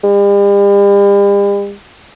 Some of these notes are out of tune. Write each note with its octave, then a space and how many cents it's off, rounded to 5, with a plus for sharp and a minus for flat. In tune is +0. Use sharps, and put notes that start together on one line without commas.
G3 +40